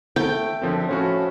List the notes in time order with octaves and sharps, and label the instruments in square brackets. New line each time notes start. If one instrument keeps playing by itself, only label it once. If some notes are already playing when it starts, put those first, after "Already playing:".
[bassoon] A3 [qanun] G5
[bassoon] F#2 [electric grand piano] D3 F3 C4
[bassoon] A2 [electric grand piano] F3 C#4 F#4